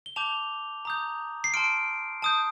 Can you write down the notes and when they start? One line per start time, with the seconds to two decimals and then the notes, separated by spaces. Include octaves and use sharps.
0.06 G7
0.16 A5 D6 G6 F7
0.85 A#5 D#6 G6
1.44 C7
1.54 A5 C6 F6 D7
2.22 A5 D#6 G6